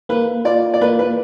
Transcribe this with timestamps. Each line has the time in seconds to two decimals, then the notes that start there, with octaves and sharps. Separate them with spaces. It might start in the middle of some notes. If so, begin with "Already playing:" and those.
0.09 A#3 B4
0.45 F4 D5
0.74 D5
0.81 A#3 B4
0.99 B4